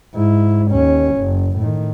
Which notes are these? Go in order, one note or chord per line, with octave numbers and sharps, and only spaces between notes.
G#2 E4
D#2 C#4
F#1
A2 D#3